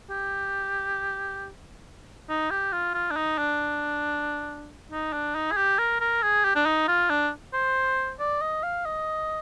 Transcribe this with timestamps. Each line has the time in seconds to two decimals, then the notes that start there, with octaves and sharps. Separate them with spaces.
0.10 G4
2.29 D#4
2.50 G4
2.72 F4
2.94 F4
3.11 D4
3.16 D#4
3.38 D4
4.91 D#4
5.13 D4
5.35 D#4
5.51 G#4
5.57 G4
5.79 A#4
6.01 A#4
6.23 G#4
6.45 G4
6.56 D4
6.66 D#4
6.88 F4
7.10 D4
7.54 C5
8.20 D5
8.41 D#5
8.63 F5
8.86 D#5